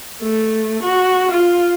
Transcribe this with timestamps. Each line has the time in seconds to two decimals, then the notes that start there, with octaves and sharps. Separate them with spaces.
0.22 A3
0.83 F#4
1.31 F4